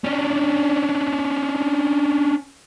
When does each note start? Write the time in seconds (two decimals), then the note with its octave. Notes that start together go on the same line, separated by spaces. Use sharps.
0.05 C#4 D4